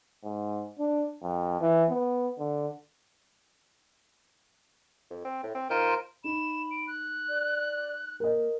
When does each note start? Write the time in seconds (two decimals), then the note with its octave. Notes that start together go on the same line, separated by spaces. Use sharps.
0.24 G#2
0.80 D4
1.23 F2
1.61 E3
1.90 B3
2.39 D3
5.10 F2
5.25 C4
5.43 A2
5.55 C4
5.70 D#3 F4 A#4 C5
6.24 D#4 B5 E7
6.71 D7
6.87 F#6
7.29 D5
8.20 A#3 A#4 D#5